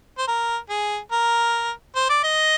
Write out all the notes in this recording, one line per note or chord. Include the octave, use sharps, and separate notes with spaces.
C5
A#4
G#4
A#4
C5
D5
D#5